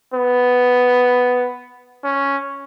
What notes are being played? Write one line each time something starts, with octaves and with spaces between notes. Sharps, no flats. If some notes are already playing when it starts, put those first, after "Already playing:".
B3
C#4